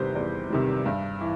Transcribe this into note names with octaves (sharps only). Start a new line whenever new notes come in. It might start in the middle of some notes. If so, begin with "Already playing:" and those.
Already playing: E2 C3 D#3 G3 B4 C5
E2 D5
C3 D#3 G3
G2
E3